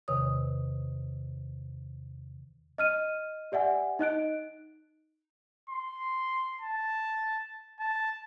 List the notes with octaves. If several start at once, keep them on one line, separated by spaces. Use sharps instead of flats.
E2 C3 D#3 B4 C#5 D#6
D#5 F6 D#7
G4 D5 E5 F#5 G#5
D#4 D#5 F#6 D7
C6
A5
A5